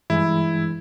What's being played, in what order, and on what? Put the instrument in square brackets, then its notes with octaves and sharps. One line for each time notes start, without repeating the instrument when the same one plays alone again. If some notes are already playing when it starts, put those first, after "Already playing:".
[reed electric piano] G2 E3 G#3 [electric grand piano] E4